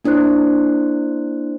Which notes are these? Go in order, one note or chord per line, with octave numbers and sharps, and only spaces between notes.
A#3 D4 E4 C5 F#6